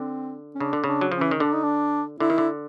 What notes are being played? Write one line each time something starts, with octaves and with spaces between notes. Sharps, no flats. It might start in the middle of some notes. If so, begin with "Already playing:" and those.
Already playing: D3 C4
C#4
C#3 D4
D3
C#3 D4
F#3
F3 C#4
E3
D#3
D3 D4
D#4
D4
D3 E4
D#3
D3